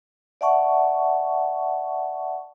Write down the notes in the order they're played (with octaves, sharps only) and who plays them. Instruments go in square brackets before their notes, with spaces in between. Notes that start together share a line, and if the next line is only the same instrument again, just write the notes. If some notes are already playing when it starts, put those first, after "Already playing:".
[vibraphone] D5 E5 F#5 A5 C#6